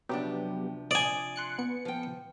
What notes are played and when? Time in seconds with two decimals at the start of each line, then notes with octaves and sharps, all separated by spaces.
0.09 C3 F3 F#3 B3 D4 G4
0.91 D5 G#5 D#6
1.36 C6 F#6 C#7
1.59 B3 C#7
1.85 F3 G5